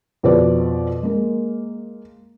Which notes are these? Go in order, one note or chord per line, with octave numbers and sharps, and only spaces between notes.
F2 B2 B4 C5 D5
G#3 A#3